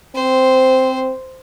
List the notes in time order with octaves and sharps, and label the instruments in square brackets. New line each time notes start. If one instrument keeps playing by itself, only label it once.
[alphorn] C4 [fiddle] C5